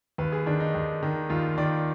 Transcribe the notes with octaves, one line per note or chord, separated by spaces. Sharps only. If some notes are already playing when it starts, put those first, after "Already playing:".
D#2 B4
G#4
D#3 D4
D#4
D#2
D#3
D#2 F4
D#3 D5